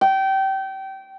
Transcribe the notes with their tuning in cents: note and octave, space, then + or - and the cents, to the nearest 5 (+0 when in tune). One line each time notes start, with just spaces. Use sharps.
G5 -25